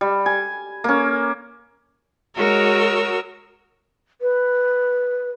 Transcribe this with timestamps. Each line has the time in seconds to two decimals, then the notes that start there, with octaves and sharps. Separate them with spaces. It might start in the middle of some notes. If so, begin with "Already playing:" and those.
0.01 G3
0.26 G#5
0.84 A#3 C#4
2.37 G#3 F#4 A#4 C#5 E6
4.21 B4